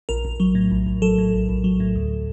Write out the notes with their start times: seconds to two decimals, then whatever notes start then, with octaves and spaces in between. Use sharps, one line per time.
0.09 A#1 A#4
0.25 A#1
0.40 F#3
0.55 A2
0.71 A#1
0.86 A#1
1.02 F#3 A4
1.18 A2
1.34 A#1
1.49 A#1
1.64 F#3
1.80 A2
1.96 D2